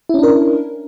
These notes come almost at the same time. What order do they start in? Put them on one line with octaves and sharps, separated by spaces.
E4 C#4 D4 A#4